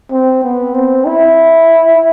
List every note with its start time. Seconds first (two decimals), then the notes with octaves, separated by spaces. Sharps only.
0.11 C4
0.43 B3
0.74 C4
1.05 E4